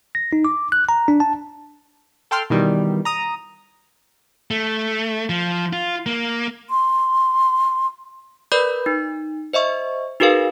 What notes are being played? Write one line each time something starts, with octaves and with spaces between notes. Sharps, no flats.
A#6
D#4
D6
F#6
A#5
D4
A5
A4 G5 C6 F6
B2 D#3 E3 G3
A#5 D#6
A3
F3
F4
A#3
C6
A#4 B4 D5 B5 G6
D#4
C5 D#5 E5 C#6
D#4 F#4 G#4 A#4 B4 F5